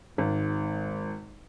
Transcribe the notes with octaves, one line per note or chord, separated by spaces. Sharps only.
G#1 G#2